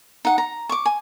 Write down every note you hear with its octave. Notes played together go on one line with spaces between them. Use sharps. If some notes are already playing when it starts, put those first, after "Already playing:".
D#4 F#5
A#5
C#6 D6
G#5